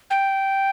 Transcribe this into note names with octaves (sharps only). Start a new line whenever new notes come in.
G5